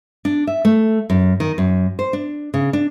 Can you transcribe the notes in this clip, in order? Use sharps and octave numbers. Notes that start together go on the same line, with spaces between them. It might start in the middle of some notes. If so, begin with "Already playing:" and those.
D4
E5
A3
F#2
D#3
F#2
C5
D4
C#3
D4